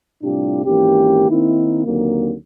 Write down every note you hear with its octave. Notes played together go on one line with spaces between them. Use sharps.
A2 C3 G3 D4 F4 G4
G#1 E3 A#3 C#4 G4
D#3 A#3 C4 D#4 E4
D#2 D3 F#3 A#3 C4